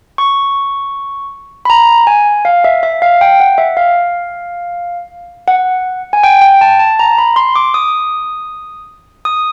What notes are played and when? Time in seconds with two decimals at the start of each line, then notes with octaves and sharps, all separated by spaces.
0.18 C#6
1.65 B5
1.70 A#5
2.07 G#5
2.45 F5
2.64 E5
2.83 E5
3.02 F5
3.21 G5
3.40 F#5
3.58 E5
3.77 F5
5.48 F#5
6.13 G#5
6.23 G5
6.42 G5
6.61 A5
6.79 A5
6.99 A#5
7.18 B5
7.36 C6
7.56 D6
7.74 D#6
9.25 D#6